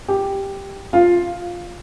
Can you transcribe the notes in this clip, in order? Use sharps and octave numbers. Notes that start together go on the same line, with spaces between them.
G4
F4